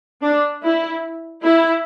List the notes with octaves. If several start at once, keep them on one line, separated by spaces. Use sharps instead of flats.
D4
E4
E4